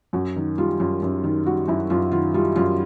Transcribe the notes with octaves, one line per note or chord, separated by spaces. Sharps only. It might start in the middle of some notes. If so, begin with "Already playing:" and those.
F#2 F#4
D#3
G3 F4
F#2 F4
F#2
D#3
G3 F#4
F#2 E4
F#2 F4
D#3 F4
G3 F4
F#2 F4